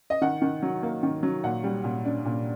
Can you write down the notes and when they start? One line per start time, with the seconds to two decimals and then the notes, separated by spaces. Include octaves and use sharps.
0.10 D#5
0.21 D#3 F#5
0.42 D#3
0.62 F#3
0.83 A#3
1.03 D#3
1.23 F#3
1.44 A#2 F#5
1.64 G3
1.84 A#2
2.05 D4
2.25 A#2